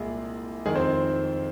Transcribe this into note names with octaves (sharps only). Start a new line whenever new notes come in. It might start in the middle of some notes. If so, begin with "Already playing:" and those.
Already playing: C2 A#2 G#3 G#4
F2 D#3 G#3 G#4
C4 C5